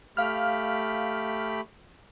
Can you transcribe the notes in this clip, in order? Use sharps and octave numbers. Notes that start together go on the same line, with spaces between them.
A3 G4 F5 B5 F6